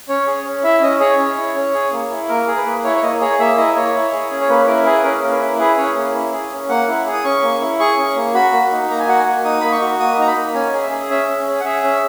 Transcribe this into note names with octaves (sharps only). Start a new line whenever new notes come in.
C#4 C#5
G#4
C#4
E4 E5
C#4 D#5
G#4 C#5
C#4
E4
C#4
G#4
A#3
E4
A#3 A#4
G#4
B4
A#3
E4 C#5
C#5
A#3 D#5
G#4 C#5
A#3 E5
E4 D#5
A#3 C#5
E4
G#4
C#4
C#5
A#3 B4
E4 A#4
G#4 B4
C#4 A#4
A#3
B4
E4
G#4 B4
C#4 C#5
A#3
E4
G#4
C#4
A#3 F#5
E4
G#4
D#6
C#4 C#6
A#3
E4
G#4 C#6
C#4
A#3
F#4 B5
A#3
D#4
A#3 A#5
G#5
F#4 F#5
G#5
A#3
D#4 D#6
A#3 B5
C#6
F#4
A#3 D#6
D#4 A#5
B5
A#3
C#4 G#5
G#4
E5
G#4
C#4 E5
C#4
G#4
F#5
G#4 E5
C#4